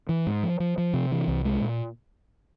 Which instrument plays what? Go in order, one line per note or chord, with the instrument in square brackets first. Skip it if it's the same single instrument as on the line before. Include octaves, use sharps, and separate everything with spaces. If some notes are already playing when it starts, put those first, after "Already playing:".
[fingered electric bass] E3
G#2
F3
F3
F3
C3
E3
C2
G#3
A#2